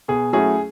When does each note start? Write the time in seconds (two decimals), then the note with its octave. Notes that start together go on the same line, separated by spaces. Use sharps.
0.08 B2 G#4
0.33 F#3 A3 C#4 E4 G#4